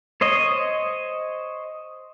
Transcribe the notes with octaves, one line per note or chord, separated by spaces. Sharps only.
C5 C#5 D#5